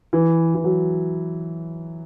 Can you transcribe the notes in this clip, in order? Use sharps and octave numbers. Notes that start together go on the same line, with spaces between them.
E3
E3
F#3